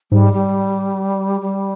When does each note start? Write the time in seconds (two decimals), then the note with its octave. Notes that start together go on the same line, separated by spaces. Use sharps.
0.12 G#2 G3
0.33 G3
1.41 G3